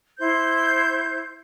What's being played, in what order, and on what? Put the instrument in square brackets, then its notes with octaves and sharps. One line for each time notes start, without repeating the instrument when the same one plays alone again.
[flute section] E4 C5 G6